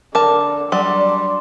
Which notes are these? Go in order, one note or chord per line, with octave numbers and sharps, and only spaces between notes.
D3 A#4 A5 D6
F#3 G3 D4 D5 C6